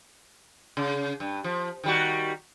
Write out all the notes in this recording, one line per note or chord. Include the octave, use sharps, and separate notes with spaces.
C#3
G2
F3
D#3 G3 F#4